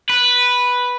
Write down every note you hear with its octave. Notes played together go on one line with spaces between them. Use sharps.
B4